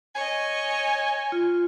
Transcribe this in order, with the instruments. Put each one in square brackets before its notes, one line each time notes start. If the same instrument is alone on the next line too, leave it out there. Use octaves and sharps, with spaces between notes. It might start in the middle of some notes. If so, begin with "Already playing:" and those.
[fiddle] C#5 D#5 [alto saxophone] G#5
[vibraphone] F4